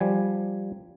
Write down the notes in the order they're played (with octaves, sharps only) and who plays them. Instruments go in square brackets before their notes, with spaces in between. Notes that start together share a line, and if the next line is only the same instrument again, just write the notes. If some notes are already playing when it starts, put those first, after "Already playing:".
[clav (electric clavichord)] F3 G3 G#5